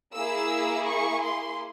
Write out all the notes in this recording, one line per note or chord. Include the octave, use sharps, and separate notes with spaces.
A#3 E4 G#4 E6
C#6
C6